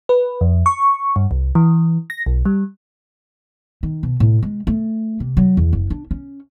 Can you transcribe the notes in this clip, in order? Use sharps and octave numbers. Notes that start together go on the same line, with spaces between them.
B4
F2
C#6
G2
C2
E3
A#6
B1
G3
D#3
B2
A2
G#3
A3
C3
F#3
E2
F#1
D4
C#4